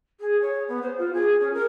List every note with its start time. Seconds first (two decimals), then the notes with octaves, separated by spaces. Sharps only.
0.20 G#4
0.40 C#5
0.68 B3
0.81 C5
0.97 F4
1.13 G#4
1.40 C#4
1.53 A#4